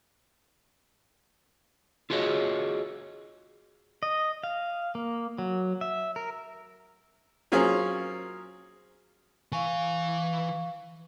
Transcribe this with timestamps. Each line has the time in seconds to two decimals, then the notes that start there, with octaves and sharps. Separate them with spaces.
2.10 F4 F#4 G#4 C#5 D#5
4.03 D#5
4.44 F5
4.95 A#3
5.38 F#3
5.81 E5
6.16 A#4
7.52 F#3 A#3 C4 C#4 F4 G#4
9.52 E3 F5 G#5 C#6